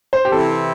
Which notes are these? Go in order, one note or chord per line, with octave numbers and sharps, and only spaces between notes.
C5
G4
C3 E3 C4 E4 A4